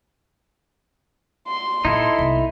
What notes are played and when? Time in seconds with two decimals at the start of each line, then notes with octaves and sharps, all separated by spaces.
1.48 C6
1.85 A#2 D#4 E4 A4
2.18 C2 B3